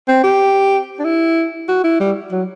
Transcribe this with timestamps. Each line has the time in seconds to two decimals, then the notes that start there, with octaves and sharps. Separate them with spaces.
0.08 C4
0.24 G4
0.99 D4
1.05 E4
1.69 F#4
1.84 E4
2.00 G3
2.32 F#3